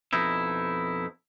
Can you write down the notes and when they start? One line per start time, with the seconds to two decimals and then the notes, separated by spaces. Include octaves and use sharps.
0.13 F2 B2 D#4 E4